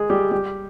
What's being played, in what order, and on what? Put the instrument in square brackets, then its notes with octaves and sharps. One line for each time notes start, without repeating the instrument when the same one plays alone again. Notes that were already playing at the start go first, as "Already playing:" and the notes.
Already playing: [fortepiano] G#3 G#4
G3 G4
G3 G4